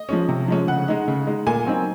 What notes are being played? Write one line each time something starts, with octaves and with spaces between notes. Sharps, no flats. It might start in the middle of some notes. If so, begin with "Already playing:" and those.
Already playing: D#5
F3 G#3 C#4
C3
F3 G#3 C#4
C#3 F#5
G#3 D#4
C#3
G#3 D#4
A#2 G#5
F#3 C4 D#4